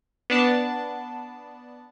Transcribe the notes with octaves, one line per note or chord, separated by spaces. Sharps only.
B3 D4 A5